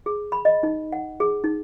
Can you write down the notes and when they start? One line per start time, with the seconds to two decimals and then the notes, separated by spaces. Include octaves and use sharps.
0.06 G#4
0.32 B5
0.45 D#5
0.63 D#4
0.92 F#5
1.20 G#4
1.44 D#4